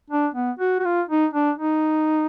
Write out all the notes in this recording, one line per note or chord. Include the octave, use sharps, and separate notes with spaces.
D4
B3
F#4
F#4
F4
D#4
D4
D#4